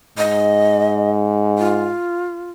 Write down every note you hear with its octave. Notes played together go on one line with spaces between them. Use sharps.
G#2 D#5
F4